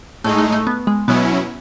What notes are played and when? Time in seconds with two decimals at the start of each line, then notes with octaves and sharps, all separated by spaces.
0.24 A2 G#3 A3 D#4
0.39 A3
0.52 A3
0.67 B3
0.87 G#3
1.08 B2 F#3 B3 C#4 E4